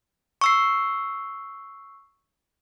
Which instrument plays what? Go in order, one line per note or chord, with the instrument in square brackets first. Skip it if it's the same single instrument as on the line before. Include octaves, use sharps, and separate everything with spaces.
[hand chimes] C#6 E6 C7